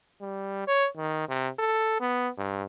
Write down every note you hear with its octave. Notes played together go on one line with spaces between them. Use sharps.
G3
C#5
D#3
C3
A4
B3
G2